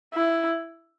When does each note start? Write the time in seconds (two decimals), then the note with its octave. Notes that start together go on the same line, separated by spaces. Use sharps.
0.14 E4